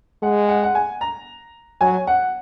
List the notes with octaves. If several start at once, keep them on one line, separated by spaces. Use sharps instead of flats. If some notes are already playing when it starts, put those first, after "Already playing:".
G#3 F#5
F#5
F#5
G#5
A#5
F#3 G#5
F#5